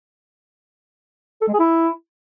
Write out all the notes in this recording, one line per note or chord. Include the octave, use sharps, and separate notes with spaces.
A4
G#3
G#4
E4